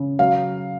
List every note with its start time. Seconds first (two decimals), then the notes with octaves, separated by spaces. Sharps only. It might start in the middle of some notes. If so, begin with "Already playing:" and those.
Already playing: C#3
0.19 F#3 F5